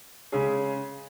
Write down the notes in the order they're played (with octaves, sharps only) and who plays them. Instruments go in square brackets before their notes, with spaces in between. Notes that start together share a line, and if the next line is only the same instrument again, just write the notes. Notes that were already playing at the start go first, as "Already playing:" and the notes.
[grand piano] C#3 G#3 C#4 G#4